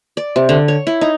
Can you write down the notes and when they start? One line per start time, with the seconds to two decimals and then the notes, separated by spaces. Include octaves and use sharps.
0.17 D5
0.36 C3
0.49 D3
0.68 C#5
0.87 E4
1.01 D#4